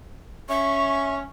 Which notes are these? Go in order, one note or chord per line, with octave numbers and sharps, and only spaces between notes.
C#4 E5 C#6